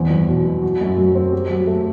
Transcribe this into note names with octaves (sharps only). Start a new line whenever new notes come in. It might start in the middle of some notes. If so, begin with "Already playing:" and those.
Already playing: E2 C4
E2
B2
F#3
F#4
F#2
F#3
C4
G4
F#3
A3